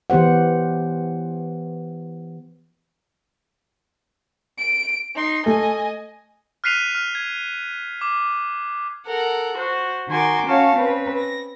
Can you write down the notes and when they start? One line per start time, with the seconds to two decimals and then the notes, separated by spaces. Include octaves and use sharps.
0.10 E3 B3 G4 C5 F#5
4.58 D7
5.15 D#4 C6
5.46 A3 D#5 G#5
6.64 F6 F#6 B6 C7 D#7 F7
6.95 F6
7.15 G#6
8.01 D6
9.06 A4 A#4 F#5
9.56 F#4 C5
10.08 D#3 F#4 A#4 G#5 C6 D6
10.45 C#4 F#4 C#5 F5 A5
10.74 C4 C#4 B4
11.18 A#6